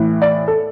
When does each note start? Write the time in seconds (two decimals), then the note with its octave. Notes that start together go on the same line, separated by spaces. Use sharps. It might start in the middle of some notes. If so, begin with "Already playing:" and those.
Already playing: A2 E3
0.22 D5
0.48 A4